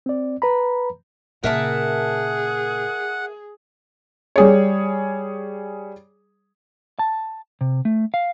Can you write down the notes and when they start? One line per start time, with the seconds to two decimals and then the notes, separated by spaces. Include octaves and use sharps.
0.06 C4 D5
0.42 B4 A#5 B5
1.44 A#2 C#3 G#4 A#4 E5 F#5 A5
4.36 G3 G#4 C#5
6.99 A5
7.61 C3
7.85 A3
8.14 F5